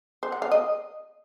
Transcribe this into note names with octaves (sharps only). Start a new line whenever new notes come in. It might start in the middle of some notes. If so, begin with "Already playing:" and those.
C5
F#5
F5
D#5